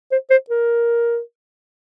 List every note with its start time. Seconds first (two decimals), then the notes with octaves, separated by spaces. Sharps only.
0.12 C5
0.30 C5
0.50 A#4